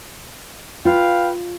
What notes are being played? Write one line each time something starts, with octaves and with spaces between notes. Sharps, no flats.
F4 B4 F5 G5